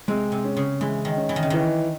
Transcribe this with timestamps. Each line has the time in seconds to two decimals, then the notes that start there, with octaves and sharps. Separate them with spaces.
0.08 C3 G#3
0.32 C3
0.44 C#4
0.57 C#3
0.81 E3 G#3
1.05 D#3
1.17 C#4
1.29 E3
1.36 D#3
1.43 C#3
1.50 D#3 E3